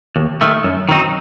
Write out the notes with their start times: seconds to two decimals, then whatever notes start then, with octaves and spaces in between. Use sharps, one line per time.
0.16 D#2
0.41 D#3 A3
0.64 F#2
0.89 D#3 F#3 C4 D#4